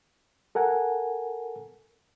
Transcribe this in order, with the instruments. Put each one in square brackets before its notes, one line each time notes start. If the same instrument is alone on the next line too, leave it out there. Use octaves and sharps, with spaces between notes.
[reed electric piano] A4 A#4 F#5 G#5